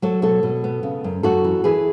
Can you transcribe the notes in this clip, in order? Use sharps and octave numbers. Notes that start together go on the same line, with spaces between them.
F#3 A4 C#5
B2 A4 C#5
B2
B3
C#3
F#2
F#2 F#4 A4
E3
E3 G#4 B4